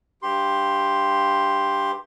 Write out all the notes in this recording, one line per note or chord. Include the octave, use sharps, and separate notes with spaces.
G2 G4 C6